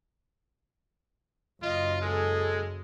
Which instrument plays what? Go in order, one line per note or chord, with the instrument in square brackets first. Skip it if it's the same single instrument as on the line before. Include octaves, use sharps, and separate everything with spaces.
[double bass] F#1 [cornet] F4 [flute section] D#5
[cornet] G#3 [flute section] G#4 A4